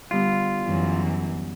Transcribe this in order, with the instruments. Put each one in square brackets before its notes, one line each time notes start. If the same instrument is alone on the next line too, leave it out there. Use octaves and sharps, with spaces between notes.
[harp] D3 G3 B3 [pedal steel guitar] F4
[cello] F#2 E3